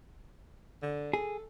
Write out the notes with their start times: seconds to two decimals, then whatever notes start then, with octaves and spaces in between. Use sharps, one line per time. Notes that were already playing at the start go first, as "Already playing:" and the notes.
0.82 D3
1.13 G#4 A4